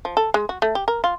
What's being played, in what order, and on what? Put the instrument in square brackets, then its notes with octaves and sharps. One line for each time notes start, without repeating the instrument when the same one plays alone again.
[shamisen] F3
A4
G#3
F#4
A3
G4
A#4
F4